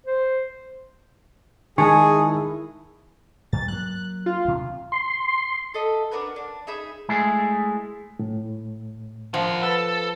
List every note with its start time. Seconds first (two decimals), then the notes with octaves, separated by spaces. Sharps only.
0.06 C5
1.78 D#3 G#3 E4 G#4 G#5 A5 C#6
3.53 G2 A6
3.68 F#3 A#3 F#6
4.26 F4
4.45 D2 C3
4.92 C6
5.74 A4 D#5 E5
6.11 D4 F#4 A#4 B4
6.36 D4
6.67 D#4 G#4 E5 B5
7.09 G#3 A3 E4 G#4
8.19 A2
9.34 F3 A#4 F#5
9.63 A4 B4